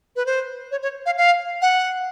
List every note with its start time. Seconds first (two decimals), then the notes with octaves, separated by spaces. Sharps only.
0.16 B4
0.26 C5
0.71 C#5
0.82 C#5
1.06 F5
1.17 F5
1.62 F#5